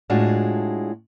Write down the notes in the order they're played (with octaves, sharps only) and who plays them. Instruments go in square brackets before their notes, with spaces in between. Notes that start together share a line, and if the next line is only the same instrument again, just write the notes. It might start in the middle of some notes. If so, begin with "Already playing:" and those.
[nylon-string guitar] A2 G#3 D4 F4 F#4